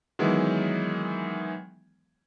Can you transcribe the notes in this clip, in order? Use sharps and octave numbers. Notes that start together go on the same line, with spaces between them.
D#3 E3 F#3 G#3 B3